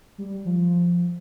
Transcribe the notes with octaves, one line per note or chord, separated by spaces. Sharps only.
G3
F3